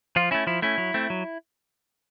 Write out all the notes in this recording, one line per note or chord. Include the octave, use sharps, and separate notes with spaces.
F3 F4
A3 C#4 E4
F3 E4
A3 C#4 E4
F#3
A3 C4
F#3